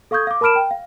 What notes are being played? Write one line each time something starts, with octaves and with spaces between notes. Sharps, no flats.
A4 F5 C#6 D#6 G6 G#6
F5 D6
A#4 A5 B5 F6 D7 E7
G5
F5